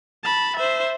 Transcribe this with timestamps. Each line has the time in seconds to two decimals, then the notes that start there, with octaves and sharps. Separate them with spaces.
0.24 A5 B5
0.57 C5 E5